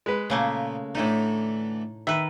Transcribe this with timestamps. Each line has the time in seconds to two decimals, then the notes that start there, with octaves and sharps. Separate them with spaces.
0.06 G#3 B4
0.30 A#2 C#3 A3 A#3
0.95 A2 D3 E3 A3 D#4
2.07 D#3 B4 E5